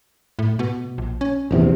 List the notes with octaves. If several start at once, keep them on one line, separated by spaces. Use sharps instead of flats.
A2
B2
A#1
C#4
A#1 E2 C3